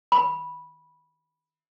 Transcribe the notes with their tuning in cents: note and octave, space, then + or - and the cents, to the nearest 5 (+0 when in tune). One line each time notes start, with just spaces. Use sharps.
B5 -10